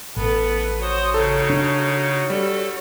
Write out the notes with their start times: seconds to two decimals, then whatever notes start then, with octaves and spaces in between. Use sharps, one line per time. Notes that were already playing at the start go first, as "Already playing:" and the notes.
0.16 A1 B3 A4 B4
0.82 F#4 C5 C#5 C6 D#6
1.14 C#3 D#4 A4
1.50 D4
2.30 G3 A4